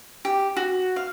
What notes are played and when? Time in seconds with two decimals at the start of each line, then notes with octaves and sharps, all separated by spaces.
0.25 G4
0.57 F#4
0.96 F5